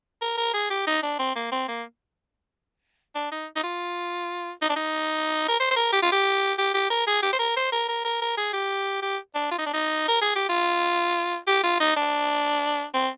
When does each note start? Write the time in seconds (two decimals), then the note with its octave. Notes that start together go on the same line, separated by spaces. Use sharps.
0.21 A#4
0.38 A#4
0.54 G#4
0.70 G4
0.87 D#4
1.03 D4
1.19 C4
1.36 A#3
1.52 C4
1.68 A#3
3.15 D4
3.32 D#4
3.56 D#4
3.64 F4
4.62 D#4
4.69 D4
4.76 D#4
5.48 A#4
5.60 C5
5.71 C5
5.76 A#4
5.93 G4
6.03 F4
6.12 G4
6.58 G4
6.74 G4
6.90 A#4
7.07 G#4
7.23 G4
7.33 C5
7.39 A#4
7.56 C5
7.72 A#4
7.88 A#4
8.05 A#4
8.22 A#4
8.38 G#4
8.53 G4
9.02 G4
9.35 D4
9.51 F4
9.59 D#4
9.66 D4
9.74 D#4
10.08 A#4
10.22 G#4
10.35 G4
10.49 F4
11.47 G4
11.64 F4
11.80 D#4
11.96 D4
12.94 C4